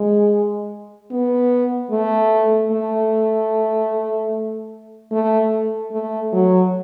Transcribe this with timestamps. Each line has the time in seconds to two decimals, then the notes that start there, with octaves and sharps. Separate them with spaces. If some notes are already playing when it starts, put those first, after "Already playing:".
Already playing: G#3
1.11 B3
1.91 A3
2.71 A3
5.12 A3
5.92 A3
6.33 F#3